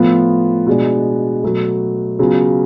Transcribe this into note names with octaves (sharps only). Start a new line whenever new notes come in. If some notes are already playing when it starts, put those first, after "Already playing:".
Already playing: A2 F3 B3 F4
B2 G#3 D4
B2 F#3 A3
C#3 F#3 B3 F4